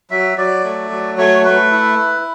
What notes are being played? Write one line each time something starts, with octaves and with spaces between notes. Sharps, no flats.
F#3 E5
F#3 D5
A3
F#3
A3 C#5
A3 B4
E4